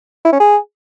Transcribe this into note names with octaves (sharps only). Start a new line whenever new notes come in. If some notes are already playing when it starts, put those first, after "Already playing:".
E4
C#4
G#4